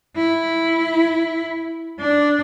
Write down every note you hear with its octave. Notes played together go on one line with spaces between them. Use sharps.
E4
D4